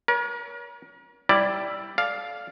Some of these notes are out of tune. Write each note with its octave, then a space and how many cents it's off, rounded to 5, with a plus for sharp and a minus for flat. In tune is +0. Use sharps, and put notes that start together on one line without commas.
A#4 +40 C#5 +35
G3 +0 E4 +0 D5 +0
A4 -35 D5 +0 F5 +0